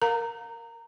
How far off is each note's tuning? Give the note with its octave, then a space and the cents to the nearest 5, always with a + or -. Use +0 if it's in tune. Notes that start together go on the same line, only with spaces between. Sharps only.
A#4 +0 F5 +30 A#5 -20